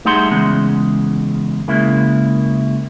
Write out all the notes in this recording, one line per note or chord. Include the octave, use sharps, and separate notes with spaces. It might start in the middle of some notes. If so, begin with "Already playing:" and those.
G3 A3 D#4 G#4 F#5 C6
E2 C#3 G#3
C#3 G#3 A#3 E4